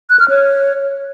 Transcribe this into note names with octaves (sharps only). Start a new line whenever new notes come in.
F#6
F6
C#5